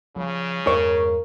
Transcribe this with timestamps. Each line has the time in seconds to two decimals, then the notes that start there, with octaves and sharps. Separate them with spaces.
0.16 C#3 F3 G3
0.67 E2 G2 G#3 A#4 C#5